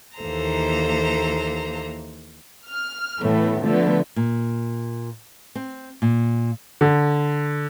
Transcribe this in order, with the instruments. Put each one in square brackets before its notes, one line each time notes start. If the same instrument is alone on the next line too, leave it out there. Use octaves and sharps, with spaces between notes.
[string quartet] D#2 E3 A#3 A4 C5 A#5
[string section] F6
A2 E3 A3 B3
D3 F3 A3 B3
[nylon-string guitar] A#2
C4
A#2
[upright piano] D3